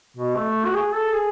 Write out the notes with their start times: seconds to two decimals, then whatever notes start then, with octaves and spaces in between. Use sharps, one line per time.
0.17 B2
0.36 A3
0.65 F#4
0.74 G#4
0.94 A4
1.13 G#4